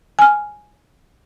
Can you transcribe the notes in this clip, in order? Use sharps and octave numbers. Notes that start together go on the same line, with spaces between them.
G#5 F6